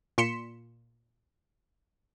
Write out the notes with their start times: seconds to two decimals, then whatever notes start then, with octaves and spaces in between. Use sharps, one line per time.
0.18 A#2 C6 B6 C#7 E7